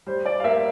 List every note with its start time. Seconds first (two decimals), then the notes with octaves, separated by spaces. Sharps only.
0.07 G3 C5
0.26 D5
0.40 F5
0.44 A#3 E5